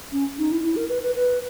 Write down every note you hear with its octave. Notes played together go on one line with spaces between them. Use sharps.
C#4
D#4
E4
E4
A#4
B4
B4
B4